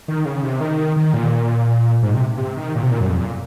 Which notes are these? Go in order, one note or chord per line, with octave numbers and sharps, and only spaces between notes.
D#3
C#3
C3
D#3
D#3
A#2
G#2
C3
C3
D#3
A#2
C3
A#2
F#2
F2
A#2